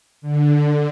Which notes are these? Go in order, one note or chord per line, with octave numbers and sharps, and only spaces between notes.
D3